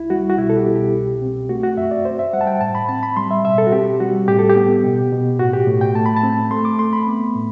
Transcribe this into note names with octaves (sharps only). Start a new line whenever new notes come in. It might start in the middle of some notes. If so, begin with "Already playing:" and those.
Already playing: C2 E4
G3 F#4
F#4
B2 E4
A4
G4
B2
G4
C2
C4
A3 F#4
F#4
F#2 E5
D5
F#2 C5
E5
G3 F#5
A5
G5
A2 A5
B5
C4 A5
B5
G3 C6
E5
B2 E5
A4
F#4
C4 G4
G3 F#4
A2 G4
A4
G4
B3
B2
B2
A2 F#4
G4
A2
G5
A3 A5
B5
A5
C4
A3 C6
D6
A3 C6
B5
B3
A2